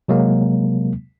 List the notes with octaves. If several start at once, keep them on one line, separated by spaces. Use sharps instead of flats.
C3 F#3 G#3 A#3